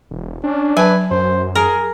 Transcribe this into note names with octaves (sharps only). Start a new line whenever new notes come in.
E1
C#4 D4
F#3 B4 G#5 A5
F#2 C5
G#4 A#4